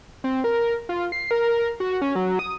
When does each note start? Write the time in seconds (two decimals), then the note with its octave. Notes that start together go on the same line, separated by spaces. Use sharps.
0.24 C4
0.44 A#4
0.89 F4
1.12 C7
1.31 A#4
1.80 F#4
2.02 C#4
2.15 F#3
2.39 D#6